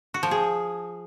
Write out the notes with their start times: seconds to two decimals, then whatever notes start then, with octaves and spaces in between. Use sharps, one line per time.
0.14 F#4
0.23 F3
0.31 G#4